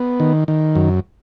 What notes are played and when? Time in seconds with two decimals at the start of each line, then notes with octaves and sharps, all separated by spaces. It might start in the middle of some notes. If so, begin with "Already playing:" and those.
Already playing: B3
0.20 D#3
0.48 D#3
0.75 F#2